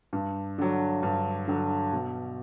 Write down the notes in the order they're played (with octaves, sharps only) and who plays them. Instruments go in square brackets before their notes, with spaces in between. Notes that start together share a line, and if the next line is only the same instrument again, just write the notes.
[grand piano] G2
D3 F#3
G2
D3 F#3
B2